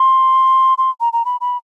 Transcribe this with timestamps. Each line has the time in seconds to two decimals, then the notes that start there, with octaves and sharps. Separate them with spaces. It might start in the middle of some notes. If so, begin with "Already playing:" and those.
Already playing: C6
0.78 C6
1.00 A#5
1.13 A#5
1.25 B5
1.41 B5